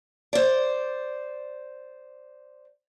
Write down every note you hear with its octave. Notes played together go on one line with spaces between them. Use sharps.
C5 D5